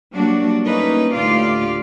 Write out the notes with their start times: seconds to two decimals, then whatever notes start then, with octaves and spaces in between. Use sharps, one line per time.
0.12 F#3 G3 A#3 D4 F#4
0.64 A3 A#3 C#4 D#4 B4
1.14 D2 A2 F4 G4 D5 F5